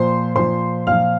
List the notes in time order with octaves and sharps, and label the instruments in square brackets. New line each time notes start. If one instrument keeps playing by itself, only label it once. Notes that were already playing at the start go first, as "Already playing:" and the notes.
Already playing: [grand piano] A#2 F3 C5 C6
A#2 F3 C5 C6
A#2 F3 F5 F6